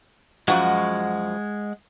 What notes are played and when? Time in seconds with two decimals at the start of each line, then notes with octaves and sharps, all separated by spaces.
0.48 F#2 F3 G#3 F#4 F#5 F#6